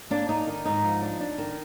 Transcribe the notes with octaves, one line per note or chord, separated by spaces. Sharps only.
A#3 D4
D4 D#4
D#3
G#2 D#4
F3
D4
D4
D#3